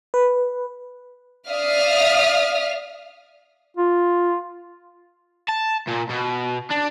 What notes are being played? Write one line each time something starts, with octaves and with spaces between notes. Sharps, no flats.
B4
D5 E5 F5 D#6 F6
F4
A5
A#2
B2
D4